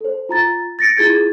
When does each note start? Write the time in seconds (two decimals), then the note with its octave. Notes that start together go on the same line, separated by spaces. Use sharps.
0.01 A4 C5
0.29 F4 A#5 A6
0.79 A6 A#6 C#7 D7
0.97 E4 F4 G#4 G#6 A6